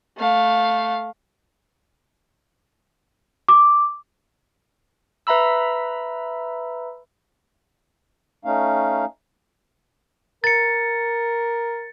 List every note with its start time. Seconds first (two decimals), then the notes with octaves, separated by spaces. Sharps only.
0.18 A3 F5
3.49 D6
5.27 B4 E5 A#5 B5 E6
8.45 A3 C#4 D#4 F5
10.44 A#4 A6 C#7